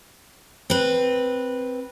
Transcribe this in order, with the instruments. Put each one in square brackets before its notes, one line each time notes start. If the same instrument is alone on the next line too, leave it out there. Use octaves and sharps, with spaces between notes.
[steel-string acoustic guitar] C4 B4